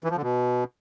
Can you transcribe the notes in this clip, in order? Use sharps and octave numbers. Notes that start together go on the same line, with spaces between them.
E3
F3
D3
B2